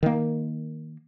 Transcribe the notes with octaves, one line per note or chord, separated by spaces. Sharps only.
D#3 A#3